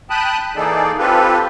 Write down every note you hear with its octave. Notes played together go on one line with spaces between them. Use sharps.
G5 A5 B5 D#6 F#6
E3 A#3 D#4 G#4 A4 D5
C4 F4 G4 A4 B4